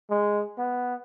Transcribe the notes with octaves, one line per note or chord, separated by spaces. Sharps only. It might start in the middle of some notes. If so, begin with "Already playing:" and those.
G#3
B3